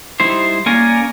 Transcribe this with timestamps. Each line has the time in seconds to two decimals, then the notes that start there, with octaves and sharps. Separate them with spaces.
0.20 G3 D#4 E4 C5
0.66 A#3 C#4 A#4 D5 G#5